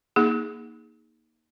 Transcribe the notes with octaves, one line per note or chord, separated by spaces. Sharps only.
A#3 D#4 G#4